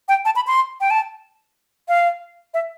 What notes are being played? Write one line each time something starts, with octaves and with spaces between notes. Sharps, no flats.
G5
A5
B5
C6
G5
A5
F5
E5